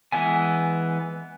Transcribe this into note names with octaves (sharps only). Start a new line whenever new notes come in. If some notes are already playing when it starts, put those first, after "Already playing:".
E3 G#3 B3 G#5